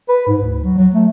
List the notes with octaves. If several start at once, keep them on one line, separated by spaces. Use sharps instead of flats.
B4
G#2
D2
F#3
F#3
A3